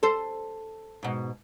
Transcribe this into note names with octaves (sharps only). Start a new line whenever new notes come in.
A4 C5
G#2 B2